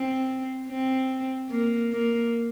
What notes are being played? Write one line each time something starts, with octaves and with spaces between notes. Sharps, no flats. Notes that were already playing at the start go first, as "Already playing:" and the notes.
Already playing: C4
C4
A#3
A#3